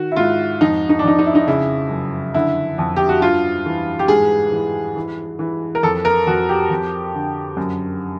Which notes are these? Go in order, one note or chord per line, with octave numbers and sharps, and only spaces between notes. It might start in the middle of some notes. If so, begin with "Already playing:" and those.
Already playing: D#3 F#4
E4
G#2 F4
F2 D#4
D#4
D4
F2 D#4
D#4
E4
D#4
C#3 E4
F#2
D3 E4
F2
G4
F#4
G2 F4
E3
G4
G#2 G#4
E3
E3
E3
A#4
F2 A4
A#4
F2 F#4
G4
F2
D3
F#2